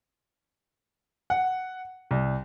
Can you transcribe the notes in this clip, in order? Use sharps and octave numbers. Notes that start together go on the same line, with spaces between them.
F#5
C2